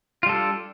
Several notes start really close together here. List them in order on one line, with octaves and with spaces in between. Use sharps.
F4 G3 A4 D4